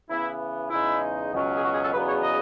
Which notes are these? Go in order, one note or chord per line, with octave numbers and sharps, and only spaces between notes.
C#3 E3 B3 E4
E2 C#3 G#3 D#4 E4
C#2 B2 F#3 C#4
G#4
F#4
G#4
A4
E2 C#3 F#3 B3 D#4 B4
C#5
D#5